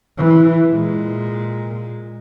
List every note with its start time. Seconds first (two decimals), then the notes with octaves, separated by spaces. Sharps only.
0.18 E3
0.71 A#2 G#3